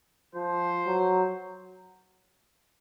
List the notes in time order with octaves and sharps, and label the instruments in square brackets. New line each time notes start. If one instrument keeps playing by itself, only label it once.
[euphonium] F3 [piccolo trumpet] C5
[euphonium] F#3